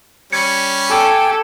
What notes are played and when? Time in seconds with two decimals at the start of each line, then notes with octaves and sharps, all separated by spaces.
0.33 G3 C#4 G#6 C#7
0.90 G4 A4 G5 G#5